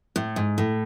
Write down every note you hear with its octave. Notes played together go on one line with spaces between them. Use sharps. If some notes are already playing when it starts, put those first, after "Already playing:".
A2
G#2
A2